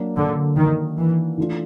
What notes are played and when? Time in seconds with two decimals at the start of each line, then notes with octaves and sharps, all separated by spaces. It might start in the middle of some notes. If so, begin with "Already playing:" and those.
Already playing: F#3 A#3 D4
0.16 D3
0.56 D#3
0.98 E3
1.38 E3 A3 D4 F4